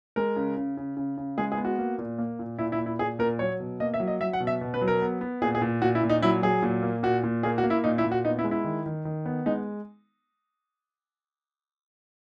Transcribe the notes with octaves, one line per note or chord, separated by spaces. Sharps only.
G#3 A#4
C#3
C#3
C#3
C#3
C#3
G#3 G#4
G#4
B3
F#4
A#3
A#2
A#3
A#2
A#2 E4
E4
A#2
E4
A#2 G#4
A#2 A#4
F#3 C#5
B2
A#3 D#5
E5
F#3
D#5
F#3 E5
F#5
B2
E5
B2
B4
F#3
A#4
B3
B3
A#2 G#4
G#4
A#2
A#2 F#4
E4
A#2
D#4
F#3 E4
F#3 G#4
A#2
A#3
A#2 F#4
A#2
A#3 G#4
F#4
A#3
E4
A#2 D#4
E4
A#2
F#4
B3 D#4
E4
G#3
E4
D#3
D#3
D#3
B3
G#3 D#4